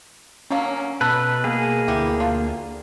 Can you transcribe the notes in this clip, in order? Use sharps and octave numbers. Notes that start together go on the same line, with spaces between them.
D3 F#3 A#3 C#4
B2 A4 B4
A#3 G#4
D2 E3 E4 G4
D4 F4